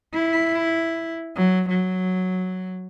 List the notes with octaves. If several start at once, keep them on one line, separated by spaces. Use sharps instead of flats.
E4
F#3
F#3